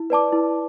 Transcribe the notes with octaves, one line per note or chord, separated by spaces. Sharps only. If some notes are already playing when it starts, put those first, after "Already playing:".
Already playing: E4
B4 D5 A5 D6
E4